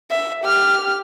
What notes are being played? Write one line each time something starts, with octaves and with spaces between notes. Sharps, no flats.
E5
G4 F6